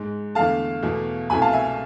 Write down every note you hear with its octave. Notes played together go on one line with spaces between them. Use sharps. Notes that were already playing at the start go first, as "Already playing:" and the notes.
Already playing: G#2 G#3
E2 D3 A3 F5 A5
E2 B2 A3
C2 B2 A3 G#5 B5
F5 A5
E5 G#5